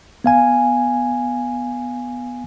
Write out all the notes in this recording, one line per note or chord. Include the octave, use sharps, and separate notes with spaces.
B3 F5 G#5